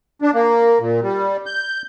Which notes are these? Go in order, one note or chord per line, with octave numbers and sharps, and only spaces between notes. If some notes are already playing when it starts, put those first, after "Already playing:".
D4
A#3
A#2
G3
G6